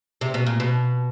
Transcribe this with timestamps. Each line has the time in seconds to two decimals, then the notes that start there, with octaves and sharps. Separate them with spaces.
0.21 C3
0.34 B2
0.46 A#2
0.60 B2